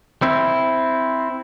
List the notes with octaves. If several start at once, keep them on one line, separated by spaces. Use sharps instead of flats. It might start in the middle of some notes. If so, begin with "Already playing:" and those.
C4 E4